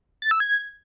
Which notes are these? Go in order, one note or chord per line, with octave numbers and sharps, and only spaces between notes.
A6
E6
G#6